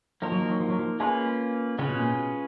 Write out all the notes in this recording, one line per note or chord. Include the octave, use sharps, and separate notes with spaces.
F3 A#3 D#4 A#4
F#3
F3
F#3
F3
F#3
F3
G#3 A#3 C#4 F4 B4
C#3 G#3 C#4 F4 G#4 B4
B2
A#2
B2